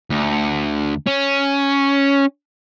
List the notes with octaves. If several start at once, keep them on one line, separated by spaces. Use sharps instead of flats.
D2
C#4